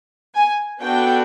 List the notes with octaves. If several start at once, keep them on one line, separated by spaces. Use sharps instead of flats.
G#5
B3 D4 F#4 A4 G5